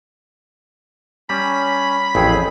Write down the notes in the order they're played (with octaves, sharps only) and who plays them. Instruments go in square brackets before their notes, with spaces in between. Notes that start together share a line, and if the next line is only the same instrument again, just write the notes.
[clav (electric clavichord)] G3 [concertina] C#4 [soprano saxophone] B5
[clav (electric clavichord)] A1 F2 [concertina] C4 G#4